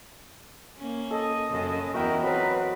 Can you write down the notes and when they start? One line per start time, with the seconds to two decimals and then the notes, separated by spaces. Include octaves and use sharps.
0.77 A#3 C#4
1.11 A4 D#5
1.50 F#2 C#3 C#4
1.94 E2 E4 F#4 A#4 D#5 G5
2.23 F#3 C4 A#4 B4